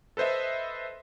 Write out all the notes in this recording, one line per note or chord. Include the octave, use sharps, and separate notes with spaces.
A4 B4 C5 D#5 E5